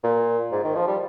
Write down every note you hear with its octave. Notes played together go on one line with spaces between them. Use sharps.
A#2
G#2
D#3
F3
G3